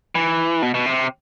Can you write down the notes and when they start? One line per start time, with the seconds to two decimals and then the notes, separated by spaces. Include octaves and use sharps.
0.15 E3
0.62 B2
0.74 B2
0.86 C3